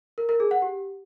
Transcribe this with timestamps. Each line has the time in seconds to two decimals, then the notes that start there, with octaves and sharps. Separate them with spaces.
0.18 A#4
0.29 A#4
0.40 G#4
0.51 F#5
0.62 G4